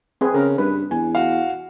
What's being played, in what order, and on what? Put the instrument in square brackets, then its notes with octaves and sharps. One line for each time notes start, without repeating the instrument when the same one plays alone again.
[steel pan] C4 G#4 B4
[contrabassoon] C#3 [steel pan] A#4
[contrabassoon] G2 [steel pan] B4
[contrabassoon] E2 [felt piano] G#5
[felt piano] F#4 F5